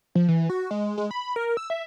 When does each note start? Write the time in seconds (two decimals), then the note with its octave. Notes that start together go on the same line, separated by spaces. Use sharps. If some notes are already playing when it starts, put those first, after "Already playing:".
0.15 F3
0.28 E3
0.50 F#4
0.71 G#3
0.98 G#3
1.11 B5
1.36 A#4
1.57 E6
1.70 E5